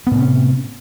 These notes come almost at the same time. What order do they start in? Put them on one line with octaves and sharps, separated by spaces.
B3 A2 C3 C#4